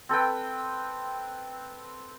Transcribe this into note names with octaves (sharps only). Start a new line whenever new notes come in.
C4 A4 B4 G5